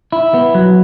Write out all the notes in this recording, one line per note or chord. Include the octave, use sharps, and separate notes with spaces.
E4
B3
F#3